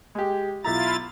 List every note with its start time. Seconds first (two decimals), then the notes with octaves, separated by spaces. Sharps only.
0.15 G#3 G4
0.65 B1 E4 F4 E5 A#5 A6